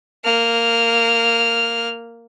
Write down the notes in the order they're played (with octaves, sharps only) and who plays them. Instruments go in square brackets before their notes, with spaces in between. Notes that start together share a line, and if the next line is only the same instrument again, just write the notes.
[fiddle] A#3 F6